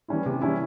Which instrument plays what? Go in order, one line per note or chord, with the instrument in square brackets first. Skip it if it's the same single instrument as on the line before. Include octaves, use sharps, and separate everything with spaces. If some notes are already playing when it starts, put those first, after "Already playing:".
[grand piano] E3 G3 C#4 E4
C3
E3 G3 C#4 E4